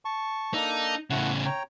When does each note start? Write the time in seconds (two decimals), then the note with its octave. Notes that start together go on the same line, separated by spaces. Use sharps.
0.05 A5 C#6
0.54 A#3 D4 D#4 A4
1.10 A2 C#3 A3 E4 F#5
1.45 C#5 G5 A#5